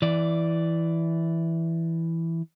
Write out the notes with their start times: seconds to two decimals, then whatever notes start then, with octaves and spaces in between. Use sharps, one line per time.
0.02 E3 D5